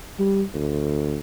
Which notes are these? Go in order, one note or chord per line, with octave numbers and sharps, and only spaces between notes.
G3
D2